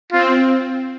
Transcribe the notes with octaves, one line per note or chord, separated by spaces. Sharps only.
C4 F4